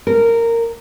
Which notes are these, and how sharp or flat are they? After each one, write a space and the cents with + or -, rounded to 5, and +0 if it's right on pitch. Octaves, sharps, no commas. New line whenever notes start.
A#4 -15